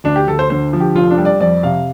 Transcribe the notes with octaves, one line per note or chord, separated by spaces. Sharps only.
D2 D4
G4
D2 A4
C5
D3 C5
F3
G4
F1 F4
D4
G3
D5
F2 D5
C3 F5